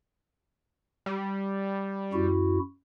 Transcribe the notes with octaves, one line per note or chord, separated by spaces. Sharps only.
G3
F#2 E4 F#4